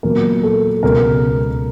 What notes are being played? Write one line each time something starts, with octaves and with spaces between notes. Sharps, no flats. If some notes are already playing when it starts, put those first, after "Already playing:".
A#2 F#3 B3 A#4
A4
C#2 B2 G#3 B3 A#4